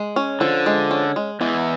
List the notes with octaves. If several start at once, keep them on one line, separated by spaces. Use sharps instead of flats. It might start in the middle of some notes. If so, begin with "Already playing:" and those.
Already playing: G#3
C#4
D3 F3
G#3
C#4
G#3
E2 E3 G#3